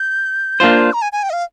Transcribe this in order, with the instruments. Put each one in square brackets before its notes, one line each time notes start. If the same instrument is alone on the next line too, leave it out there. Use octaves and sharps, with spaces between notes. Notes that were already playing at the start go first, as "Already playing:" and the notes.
Already playing: [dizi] G6
[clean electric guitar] A#3 D4 F4 C5
[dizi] A#5
G#5
G#5
G5
D#5
F5